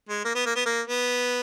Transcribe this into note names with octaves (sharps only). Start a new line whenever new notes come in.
G#3
A#3
B3
A#3
B3
A#3
B3